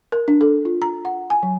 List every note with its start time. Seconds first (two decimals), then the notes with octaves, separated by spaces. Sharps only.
0.12 A#4
0.28 D4
0.41 A4
0.65 F4
0.82 A#5
1.05 F#5
1.30 G#5
1.43 F#3